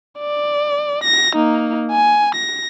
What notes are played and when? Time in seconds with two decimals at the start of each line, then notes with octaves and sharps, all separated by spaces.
0.19 D5
1.04 A#6
1.35 A#3 D#4
1.91 G#5
2.35 A#6